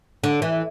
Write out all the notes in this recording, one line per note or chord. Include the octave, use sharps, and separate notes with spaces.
D3
E3